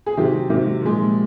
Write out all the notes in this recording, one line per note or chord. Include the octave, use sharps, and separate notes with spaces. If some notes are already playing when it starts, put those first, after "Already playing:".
G#4
C3 D#3 F#3 G4
C3 D#3 F#3
A#2 F3 G#3